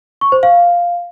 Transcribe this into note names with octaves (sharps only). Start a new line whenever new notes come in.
C#6
C5
F5